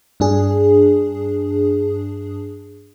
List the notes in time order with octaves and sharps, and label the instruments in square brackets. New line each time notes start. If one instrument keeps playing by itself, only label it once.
[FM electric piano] G2 D4 G#4